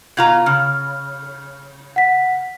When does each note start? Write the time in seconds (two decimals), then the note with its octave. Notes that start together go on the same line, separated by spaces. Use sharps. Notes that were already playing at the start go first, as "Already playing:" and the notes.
0.17 B2 F4 A#5 G#6
0.46 C#3 F6
1.96 F#5 B6